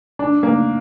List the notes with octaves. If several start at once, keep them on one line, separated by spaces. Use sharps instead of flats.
D4
A#3